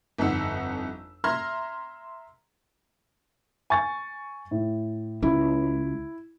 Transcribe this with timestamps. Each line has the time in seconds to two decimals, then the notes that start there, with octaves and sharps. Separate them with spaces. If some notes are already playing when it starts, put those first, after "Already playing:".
0.18 G1 F2 D#4 F#5 E6
1.24 E5 A#5 C6 F6 G#6 A#6
3.70 G#5 C#6 A6
4.51 A2
5.23 C#2 E4